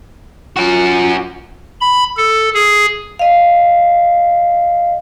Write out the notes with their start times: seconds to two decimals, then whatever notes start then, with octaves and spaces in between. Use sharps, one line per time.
0.57 C#4 F4 F#4
1.81 B5
2.17 A4
2.54 G#4
3.19 D#5 F5